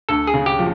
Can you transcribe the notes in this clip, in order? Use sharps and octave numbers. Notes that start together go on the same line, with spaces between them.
D2 A4
G#4
C#3
G4
F3